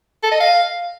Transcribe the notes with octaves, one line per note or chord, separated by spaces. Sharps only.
A4
D#5
F5